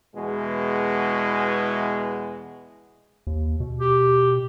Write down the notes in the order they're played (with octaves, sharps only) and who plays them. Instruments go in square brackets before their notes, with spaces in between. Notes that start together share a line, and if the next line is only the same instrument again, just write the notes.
[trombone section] E2 B2 G#3
[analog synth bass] D#2
B2
[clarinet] G4